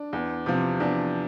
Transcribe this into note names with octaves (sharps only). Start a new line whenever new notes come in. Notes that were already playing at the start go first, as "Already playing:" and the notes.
Already playing: D4
E2
C3 F3
E2 D4